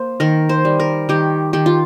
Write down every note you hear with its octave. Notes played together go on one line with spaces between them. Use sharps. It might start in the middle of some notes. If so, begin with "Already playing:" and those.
Already playing: A#3 C5
D#3 A#4
C5
G3
A#4
D#3 G4
D#3 G4
F4